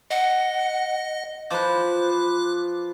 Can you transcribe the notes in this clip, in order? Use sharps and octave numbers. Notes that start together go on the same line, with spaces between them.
D#5 F#5
F3 B4 C5 D6 F#6